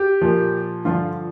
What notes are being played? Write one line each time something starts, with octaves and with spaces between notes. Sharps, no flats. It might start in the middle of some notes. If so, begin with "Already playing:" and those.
Already playing: G4
A#2 F3
G2 D3 F3 F4